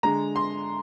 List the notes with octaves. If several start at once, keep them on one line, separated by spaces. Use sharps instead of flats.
D3 G#3 A#5
C6